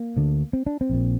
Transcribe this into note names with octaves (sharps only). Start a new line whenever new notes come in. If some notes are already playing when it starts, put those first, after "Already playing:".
Already playing: A#3
D2 D3
C4
D4
C4
A#1 A#2